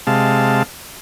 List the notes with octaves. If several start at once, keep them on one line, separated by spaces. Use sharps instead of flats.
C3 G#3 F5 A5